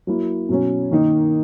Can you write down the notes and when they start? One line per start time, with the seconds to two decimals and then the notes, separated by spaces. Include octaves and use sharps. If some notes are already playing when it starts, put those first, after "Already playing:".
0.07 F#3 A#3 E4
0.49 B2 F#3 C#4
0.91 D#3 A#3 D#4